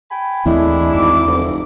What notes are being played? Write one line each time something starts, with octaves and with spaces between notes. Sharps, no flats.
G5 G#5 B5
D#2 A2 E3 G#3 C4 D4 E4
G#1 E2 D6
F1 D2